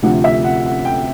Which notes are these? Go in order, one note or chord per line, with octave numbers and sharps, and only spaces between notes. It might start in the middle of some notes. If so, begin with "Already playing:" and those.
D2 C3 F3 A3 F#5
E5
F#5
F#5
G5